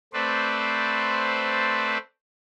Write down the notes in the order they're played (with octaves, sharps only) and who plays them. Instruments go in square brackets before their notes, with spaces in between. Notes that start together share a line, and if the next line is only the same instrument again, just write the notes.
[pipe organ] A3 C4 B4 C5 D5